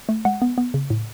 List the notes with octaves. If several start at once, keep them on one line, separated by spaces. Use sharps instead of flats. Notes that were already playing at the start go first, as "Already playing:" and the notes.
A3
G#3 F#5
B3
B3
C#3
A2